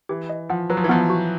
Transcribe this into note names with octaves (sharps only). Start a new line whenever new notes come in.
E3 G4
D#5
F3 F#5
F#3 B4
F3
E3
F3 B3
F#4